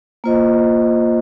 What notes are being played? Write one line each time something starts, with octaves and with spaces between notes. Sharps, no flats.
A#3 F4 C5 D#5